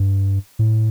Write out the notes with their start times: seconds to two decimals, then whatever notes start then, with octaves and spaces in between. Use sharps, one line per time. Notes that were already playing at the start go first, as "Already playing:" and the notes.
Already playing: G2
0.59 A2